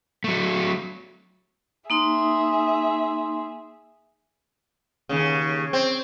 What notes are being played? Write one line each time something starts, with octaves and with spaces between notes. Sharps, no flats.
F#3 A3
A#3 D#4 G#4 E5 C6
D#2 C#3
C4